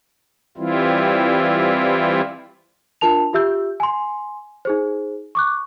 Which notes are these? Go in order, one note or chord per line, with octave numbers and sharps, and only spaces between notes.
E3 G3 C4 E4 F4
D4 F4 A#4 A5 F7
F4 G4 E5 E6 G6
G#5 C6
D#4 G#4 C5
C#6 D6 F#6